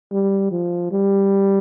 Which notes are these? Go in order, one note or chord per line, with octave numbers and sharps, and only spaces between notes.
G3
F3
G3